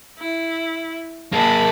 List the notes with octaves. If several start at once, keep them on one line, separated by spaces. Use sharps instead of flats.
E4
A#3 G#4 A5 B5